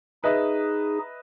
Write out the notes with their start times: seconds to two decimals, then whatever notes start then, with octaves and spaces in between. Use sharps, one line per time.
0.24 D#4 G#4 B4 D#5 E5